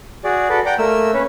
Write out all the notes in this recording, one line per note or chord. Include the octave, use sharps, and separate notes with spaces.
F#4 G#4 D5
F#4 A4 B4 D5
D5 F#5 G5 A#5 D6
A3 A#3 A#4 E6
C#4 B4 C#5